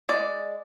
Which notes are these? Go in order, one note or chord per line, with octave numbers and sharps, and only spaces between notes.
G#3 D5